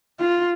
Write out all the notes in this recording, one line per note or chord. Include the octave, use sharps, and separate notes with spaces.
F4